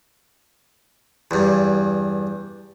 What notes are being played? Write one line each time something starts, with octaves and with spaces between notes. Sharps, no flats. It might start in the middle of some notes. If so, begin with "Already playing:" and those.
E2 G2